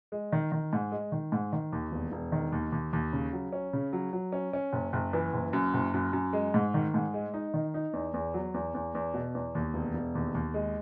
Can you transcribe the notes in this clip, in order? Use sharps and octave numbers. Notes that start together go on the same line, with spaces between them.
G#3
D#3
D#3
G#2
G#3
D#3
G#2
D#3
D#2
E1
E1
D#3
D#2
D#2
D#2
C#3
F#3
C#4
C#3
F#3
F#3
C#4
C#4
F#1
F#1
E3
F#1
F#2
F#1
F#2
F#2
G#3
G#2
D#3
G#2
G#3
D#4
D#3
D#4
E2
E2
F#3
E2
E2
E2
B2
E2
D#2
E1
E1
D#2
D#2
G#3